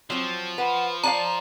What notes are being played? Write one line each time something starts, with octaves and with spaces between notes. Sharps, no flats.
F3 F#3 C4
B4 F#5
D4 D5 F5 A5 A#5